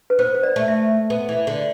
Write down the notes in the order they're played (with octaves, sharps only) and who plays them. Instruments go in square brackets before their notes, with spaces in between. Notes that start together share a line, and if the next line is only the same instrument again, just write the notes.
[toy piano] B4
[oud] B3 [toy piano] C5
[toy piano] C5
D5
[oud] A3
[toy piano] E5
[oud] B3
E3
D3